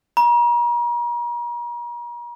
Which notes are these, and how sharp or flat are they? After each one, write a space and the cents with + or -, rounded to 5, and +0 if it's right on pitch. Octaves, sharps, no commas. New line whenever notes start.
A#5 +40